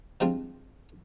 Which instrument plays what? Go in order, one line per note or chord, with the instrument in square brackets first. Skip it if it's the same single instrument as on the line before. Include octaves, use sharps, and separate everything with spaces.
[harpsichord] F3 G3 G#3 C4 D4 F4